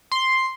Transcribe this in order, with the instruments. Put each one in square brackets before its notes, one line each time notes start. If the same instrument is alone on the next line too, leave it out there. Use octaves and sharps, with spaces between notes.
[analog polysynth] C6